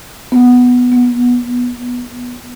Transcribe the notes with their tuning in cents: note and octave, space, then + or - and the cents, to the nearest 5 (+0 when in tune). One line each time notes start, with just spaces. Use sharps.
B3 +0
B3 -20